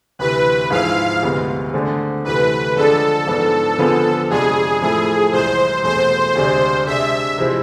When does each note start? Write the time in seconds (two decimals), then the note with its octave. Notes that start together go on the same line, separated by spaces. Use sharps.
0.19 D2 C3 E3 B4
0.70 G#2 F3 G#3 C4 E4 F5
1.22 D2 C3 G#3 B3
1.73 D3 A3 C4 G#4
2.25 D2 C3 E3 A3 B4
2.76 D3 F3 G#3 D4 G#4 A4
3.27 G#2 F3 B3 D4
3.78 D3 F3 B3 F4 G#4
4.30 F2 C3 G#3 D4 G#4
4.81 A2 F3 A3 E4 G#4
5.32 C2 C3 E3 G#3 C5
5.83 E2 B2 A3 C4 G#4 C5
6.35 D2 C3 G#3 D4 G#4
6.86 C3 G#3 D4 G#4 E5
7.38 C3 F3 G#3 C4 E4